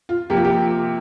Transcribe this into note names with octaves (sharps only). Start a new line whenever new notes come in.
F4
C3 F3 A#3 G4
F4
G4